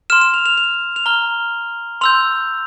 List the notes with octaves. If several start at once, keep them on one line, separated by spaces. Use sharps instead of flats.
C6 F6 E7
E7
F7
F7
F7
F7
A#5 F6 G7
C6 E6 G6 F7